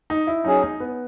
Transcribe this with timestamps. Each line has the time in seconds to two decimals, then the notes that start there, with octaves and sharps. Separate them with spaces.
0.10 D#4
0.27 E4
0.44 F#3 C#4 D#4 G#4
0.62 D#4
0.80 B3